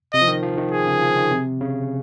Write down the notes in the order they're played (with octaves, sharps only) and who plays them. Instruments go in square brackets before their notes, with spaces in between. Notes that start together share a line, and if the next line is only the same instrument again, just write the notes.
[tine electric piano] C3 [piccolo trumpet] D#5
[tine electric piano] F3
D#3
F3
D#3
[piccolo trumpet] G#4
[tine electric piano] C#3
F3
D#3
C3
C#3